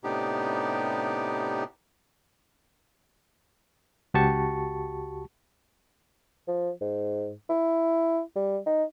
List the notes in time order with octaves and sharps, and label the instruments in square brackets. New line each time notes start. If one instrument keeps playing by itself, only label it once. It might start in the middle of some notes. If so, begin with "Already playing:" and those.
[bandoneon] A2 C3 B3 D4 D#4 G4
[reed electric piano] C#2 F#4 G4 A5 C#6
[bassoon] F3
G#2
E4
G3
D#4